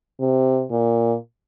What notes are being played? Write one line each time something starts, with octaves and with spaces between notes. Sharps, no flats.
C3
A#2